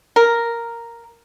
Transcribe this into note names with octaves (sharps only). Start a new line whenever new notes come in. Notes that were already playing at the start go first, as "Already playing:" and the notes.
A#4